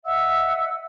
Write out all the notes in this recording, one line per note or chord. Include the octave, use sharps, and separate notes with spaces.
D#5 E5 F#5 E6